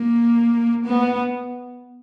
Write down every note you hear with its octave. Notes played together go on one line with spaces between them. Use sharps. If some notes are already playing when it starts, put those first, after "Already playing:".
Already playing: A#3
B3